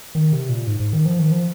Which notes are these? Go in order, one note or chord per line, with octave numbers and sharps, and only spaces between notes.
D#3
C3
A#2
G#2
G#2
D#3
F3
D#3
F3